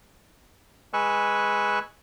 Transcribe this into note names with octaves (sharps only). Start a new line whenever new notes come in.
G#3 B4 G#5 C#6 E6 F#6